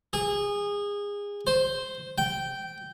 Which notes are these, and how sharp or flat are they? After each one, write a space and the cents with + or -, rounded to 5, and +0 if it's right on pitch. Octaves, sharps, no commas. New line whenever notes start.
G#4 -25
C5 -5
G5 -10